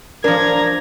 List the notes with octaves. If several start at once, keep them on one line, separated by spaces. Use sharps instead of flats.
F3 D4 A#4 A#5 G#6